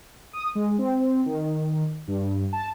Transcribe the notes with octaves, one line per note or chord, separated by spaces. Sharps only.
D#6
G#3
C4
D#3
G2
A5